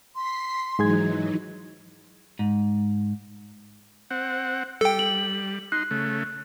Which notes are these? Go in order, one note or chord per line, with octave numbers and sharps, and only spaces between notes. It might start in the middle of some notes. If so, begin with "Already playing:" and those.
C6 B6 C7
G#2 E3 F#3 D#4 G#4 G#6
G#2
C4 F#5
G3 A4 G5
F#7
D#4 C6 F#6
C#3 A3